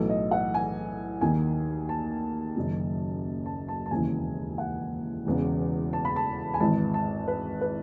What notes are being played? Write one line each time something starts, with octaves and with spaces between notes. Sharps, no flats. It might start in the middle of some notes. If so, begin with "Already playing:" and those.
Already playing: B1 A2 E3 A4
D#5
F#5
G#5
D#2 D#3 G#5
A5
F#1 F#2 D#3
A5
A5
A5
E1 D#2 C#3 E3 G#5
F#5
E1 E2 C#3
A5
B5
A5
G#5
G#1 G#2 E3 A5
A5
B4
B4